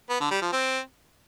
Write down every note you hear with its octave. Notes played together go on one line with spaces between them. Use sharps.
B3
D3
G3
F3
C4